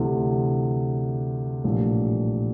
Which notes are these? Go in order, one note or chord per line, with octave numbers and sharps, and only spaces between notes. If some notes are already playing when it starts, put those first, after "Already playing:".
Already playing: D2 C3 E3
A#1 A2 E3 G3